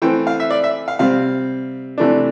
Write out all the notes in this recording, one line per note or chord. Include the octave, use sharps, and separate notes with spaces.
E3 A3 C4 G5
F5
E5
D5
E5
F5
C3 G3 C4 F5
C3 E3 A3 D4